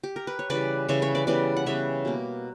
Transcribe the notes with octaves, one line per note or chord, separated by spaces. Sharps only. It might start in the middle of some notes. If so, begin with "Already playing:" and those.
G4
A#4
B4
C#5
C#3 E3 G3 B4 D5
C#3 E3 G3 C#5 E5
C#5 E5
B4 D5
C#3 E3 G3 B3 B4 D5
F#5
C#3 E3 G3 B3 C#5 E5
B2 A#3